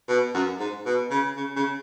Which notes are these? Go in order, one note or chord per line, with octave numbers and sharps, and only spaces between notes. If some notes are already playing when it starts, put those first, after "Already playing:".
B2
F#2
G#2
B2
C#3
C#3
C#3